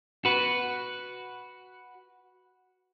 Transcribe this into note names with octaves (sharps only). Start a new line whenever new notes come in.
F#4 B4